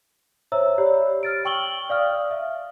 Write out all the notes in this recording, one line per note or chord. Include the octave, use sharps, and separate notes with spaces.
C5 C#5 E5 A#5 E6
G4 C#5 D5 B5
F6 A6 D7
G5 C#6 E6 F#7 G7
D5 F5 D#6 F6
E5